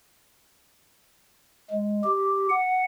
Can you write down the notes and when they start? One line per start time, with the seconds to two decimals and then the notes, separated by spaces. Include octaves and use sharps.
1.70 G#3
2.04 G4
2.50 F#5